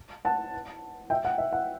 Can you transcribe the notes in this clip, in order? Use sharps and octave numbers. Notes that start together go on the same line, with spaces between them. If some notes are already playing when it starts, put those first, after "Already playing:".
F#5 A5
E5 G5
F#5
E5
F#5